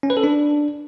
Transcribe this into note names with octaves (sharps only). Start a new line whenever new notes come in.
C#4
B4
A4
D4